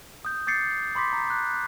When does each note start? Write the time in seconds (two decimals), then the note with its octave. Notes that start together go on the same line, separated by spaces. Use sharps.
0.25 D#6 G6
0.47 D6 G6 A6 C7 C#7
0.95 B5 C6 D6 B6
1.13 A#5 C6
1.30 F#6